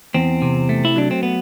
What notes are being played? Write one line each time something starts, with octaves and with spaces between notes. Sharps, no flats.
E2 C4
C3
A3
E4
F#3 D4
C4
B3